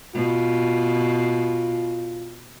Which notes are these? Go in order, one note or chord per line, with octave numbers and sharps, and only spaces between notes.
B2 F4